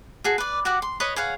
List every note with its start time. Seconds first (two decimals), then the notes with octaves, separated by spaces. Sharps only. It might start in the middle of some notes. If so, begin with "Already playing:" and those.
0.24 F#4 G#4 A4
0.38 B4 D5
0.65 F#4 G4 F#5 D6
0.82 C6
1.00 B4 C#5 D#5
1.16 G#4 C#5 F5 F#5